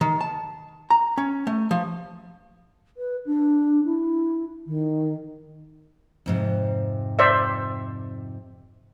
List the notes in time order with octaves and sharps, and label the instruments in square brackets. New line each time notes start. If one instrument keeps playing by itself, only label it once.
[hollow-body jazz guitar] D#3
A5
A#5
C#4
A3
F3
[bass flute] B4
D4
E4
D#3
[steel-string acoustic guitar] F2 G#2 C3
[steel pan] C5 D5 E5